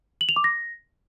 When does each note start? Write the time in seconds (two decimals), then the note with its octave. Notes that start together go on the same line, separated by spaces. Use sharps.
0.21 F#7
0.29 F7
0.36 D6
0.44 A#6